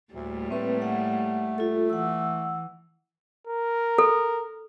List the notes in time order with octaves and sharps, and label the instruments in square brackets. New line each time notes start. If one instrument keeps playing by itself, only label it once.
[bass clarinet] D2 [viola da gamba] A2 G3 A#3
[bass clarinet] A3 [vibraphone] C4 B4
[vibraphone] F#5
F4 A4
[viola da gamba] E3 [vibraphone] F#5 E6
[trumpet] A#4
[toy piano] A4